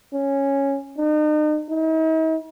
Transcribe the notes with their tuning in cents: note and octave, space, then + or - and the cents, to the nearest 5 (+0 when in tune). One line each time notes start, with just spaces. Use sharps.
C#4 -5
D#4 -40
D#4 +45